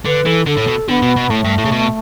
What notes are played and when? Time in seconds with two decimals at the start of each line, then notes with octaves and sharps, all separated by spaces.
0.06 D3 B4
0.26 E3 A4
0.47 D3 A4
0.57 A2
0.68 B2
0.89 D3 B3
1.02 B2
1.16 B2
1.30 A2 A3
1.44 G2
1.58 A2
1.65 C#3
1.72 B2